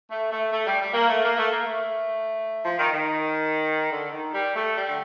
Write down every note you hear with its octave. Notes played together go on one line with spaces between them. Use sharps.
A3
A3
A3
G3
G3
A#3
A3
A#3
A3
A#3
A3
F3
D#3
D#3
D3
D#3
G3
A3
G3
D3